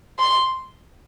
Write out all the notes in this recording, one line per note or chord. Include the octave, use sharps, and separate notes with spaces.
C6